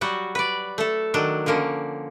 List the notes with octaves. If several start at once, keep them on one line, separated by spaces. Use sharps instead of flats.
F#3 G3 F#4
B4 D5
A3 A4
D#3 F#3 D4
D3 F3 A#3 C#4